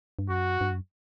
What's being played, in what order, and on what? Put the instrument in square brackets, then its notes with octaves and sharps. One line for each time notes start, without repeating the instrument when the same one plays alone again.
[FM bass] G2
[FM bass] F#2 [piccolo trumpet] F#4
[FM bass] G2
F#2